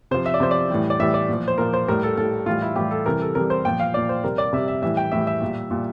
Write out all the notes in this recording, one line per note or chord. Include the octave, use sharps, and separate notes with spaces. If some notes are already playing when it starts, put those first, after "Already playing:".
C3 F3 C5
E5
D5
C3 F3 C5
D5
A2 E3 G3
D5
A2 E3 G3 E5
D5
A#2 F3
C5
A#2 F3 A#4
C5
A2 G3 A#4
A4
A2 G3 A4
A2 E3 G3 F4
E4
A2 E3 G3 G4
A4
C3 E3 G3 A#4
A4
C3 E3 G3 A#4
C5
A#2 F3 G5
F5
A#2 F3 D5
C5
C3 G3 A#4
D5
C3 G3 E5
E5
A2 E3 G3 E5
G5
A2 E3 G3 E5
E5
A#2 G3
A#2 G3